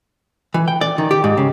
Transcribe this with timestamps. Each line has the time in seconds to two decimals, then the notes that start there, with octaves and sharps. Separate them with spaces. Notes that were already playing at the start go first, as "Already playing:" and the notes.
0.54 E3
0.68 G5
0.81 D5
0.98 D#3
1.11 G4
1.24 G#2
1.37 C#3